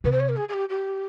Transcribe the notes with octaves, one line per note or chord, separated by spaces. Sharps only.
C3 B4
C5
C#5
A#4
G#4
G#4
G4
G4